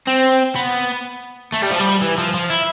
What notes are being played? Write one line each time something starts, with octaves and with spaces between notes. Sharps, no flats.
C4
B3
A3
G3
F3
G3
E3
F3
F3
E4